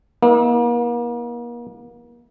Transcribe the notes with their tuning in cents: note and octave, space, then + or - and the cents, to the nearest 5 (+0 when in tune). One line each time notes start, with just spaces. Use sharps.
A#3 +40 E4 -40